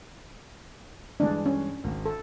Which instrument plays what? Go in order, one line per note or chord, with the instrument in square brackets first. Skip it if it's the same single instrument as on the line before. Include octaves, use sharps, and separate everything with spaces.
[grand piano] G2 E3 G#3 [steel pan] D4
[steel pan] C#4
[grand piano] G#1 G#2
[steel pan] A4